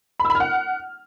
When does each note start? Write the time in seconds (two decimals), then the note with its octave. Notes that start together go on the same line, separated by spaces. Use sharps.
0.20 B5
0.25 E6
0.30 B5
0.35 F6
0.40 F#5